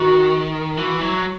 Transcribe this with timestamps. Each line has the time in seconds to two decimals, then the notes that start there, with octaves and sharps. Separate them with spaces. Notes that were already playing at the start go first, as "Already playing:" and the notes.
Already playing: D#3 F#4
0.77 E3 F#4
0.95 E4
1.01 F#3
1.13 F#4